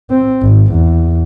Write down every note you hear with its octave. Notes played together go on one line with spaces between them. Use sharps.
C4
G#1
E2